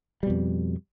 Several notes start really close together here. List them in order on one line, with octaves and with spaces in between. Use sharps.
G3 B2 F2